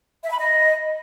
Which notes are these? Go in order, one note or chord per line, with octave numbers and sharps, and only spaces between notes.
E5
B5
D#5